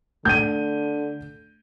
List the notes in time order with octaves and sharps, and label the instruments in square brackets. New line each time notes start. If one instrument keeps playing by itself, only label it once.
[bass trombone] D3 [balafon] A3 [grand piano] G6 D#7